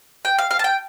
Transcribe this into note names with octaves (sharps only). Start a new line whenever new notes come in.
G5
F5
F5
A5
G5